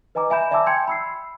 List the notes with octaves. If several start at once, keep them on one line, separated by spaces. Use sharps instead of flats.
B4 D#5 G#5 A#5 D6
E5 G#5 B5 G6 E7
D5 E5 G#5 A5 D6 E6
G5 G#5 C6 G6 G#6 C#7
B5 E6 C7